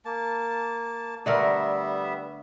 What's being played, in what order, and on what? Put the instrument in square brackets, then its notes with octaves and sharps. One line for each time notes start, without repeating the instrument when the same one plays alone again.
[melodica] A#3 A5
[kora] D3 A3 A#4 [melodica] G3 B3 E5